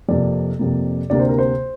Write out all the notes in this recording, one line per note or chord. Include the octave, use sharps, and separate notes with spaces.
F2 C3 A#3 D5
F2 C3 A#3
D2 C3 A#3 D5
C5
A#4
C5